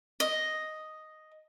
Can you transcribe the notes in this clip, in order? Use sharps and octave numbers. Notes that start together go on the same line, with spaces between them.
D#5